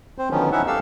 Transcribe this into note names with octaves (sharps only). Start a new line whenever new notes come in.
C4 C5
D3 D#3 F3 F#3 B3 C#4
C#4 D#4 E4 E5 F#5
G4 A4 F5 E6